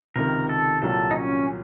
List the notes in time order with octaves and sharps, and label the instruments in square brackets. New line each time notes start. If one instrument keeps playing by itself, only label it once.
[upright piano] C#2 C3 D#3 [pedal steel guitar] A#4
[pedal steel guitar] A4
[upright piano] C2 A#2 F#3 [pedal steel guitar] A4
[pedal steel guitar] D#4
C#4